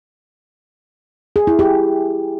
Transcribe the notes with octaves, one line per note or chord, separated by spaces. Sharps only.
G#4
E4
G4